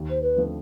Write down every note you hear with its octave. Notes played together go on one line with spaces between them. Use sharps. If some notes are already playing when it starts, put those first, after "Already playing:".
Already playing: D#2
C5
B4
D3 F3 A3 C4